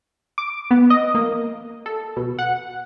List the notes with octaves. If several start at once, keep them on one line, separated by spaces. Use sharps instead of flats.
D6
B3
D#5
A#3
A4
B2
F#5